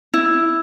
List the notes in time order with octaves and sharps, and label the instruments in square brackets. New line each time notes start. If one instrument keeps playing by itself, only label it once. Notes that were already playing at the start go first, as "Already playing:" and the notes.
[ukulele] E4